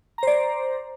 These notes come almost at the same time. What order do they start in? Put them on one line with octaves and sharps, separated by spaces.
A#5 C5 D5